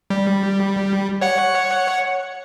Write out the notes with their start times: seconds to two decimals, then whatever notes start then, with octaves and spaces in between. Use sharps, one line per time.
0.10 G3
1.21 C#5 F#5 C#7